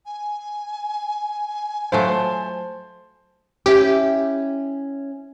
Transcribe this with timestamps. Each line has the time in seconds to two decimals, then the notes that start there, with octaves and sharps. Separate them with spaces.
0.06 G#5
1.92 F#3 A3 F4 C5 A5 C6
3.66 C#4 E4 G4 G5